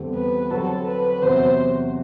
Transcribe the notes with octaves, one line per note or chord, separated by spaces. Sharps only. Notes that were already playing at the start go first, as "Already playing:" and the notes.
Already playing: E2 D3 G3 C4
B4
D3 F#3 C4 F#4 A4
B4
E2 C3 F#3 C4 F#4 C5